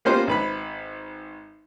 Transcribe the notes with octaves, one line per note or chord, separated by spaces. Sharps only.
A#3 B3 C#4 F4 G4 C5
G#1 B4 B5